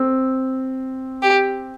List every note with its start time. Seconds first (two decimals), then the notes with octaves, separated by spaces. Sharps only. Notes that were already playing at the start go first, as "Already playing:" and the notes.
Already playing: C4
1.23 G4